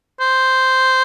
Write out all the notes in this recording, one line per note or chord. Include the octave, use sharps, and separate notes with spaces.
C5